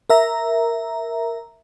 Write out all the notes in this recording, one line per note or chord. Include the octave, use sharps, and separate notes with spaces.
A#4 E5 A#5